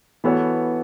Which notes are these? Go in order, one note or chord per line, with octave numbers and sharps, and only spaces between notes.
E3 B3 F#4 A4 C#5